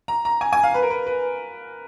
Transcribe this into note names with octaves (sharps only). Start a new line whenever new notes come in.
A#5
A#5
G#5
G#5
F5
B4
A#4
B4
B4